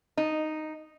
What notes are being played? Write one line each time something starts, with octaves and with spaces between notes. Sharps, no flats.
D#4